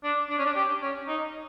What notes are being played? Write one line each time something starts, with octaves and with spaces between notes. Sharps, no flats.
D4
D4
C#4
D4
G4
C#4
D#4